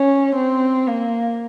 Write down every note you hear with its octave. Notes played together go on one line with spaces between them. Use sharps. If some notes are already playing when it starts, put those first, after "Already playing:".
Already playing: C#4
C4
A#3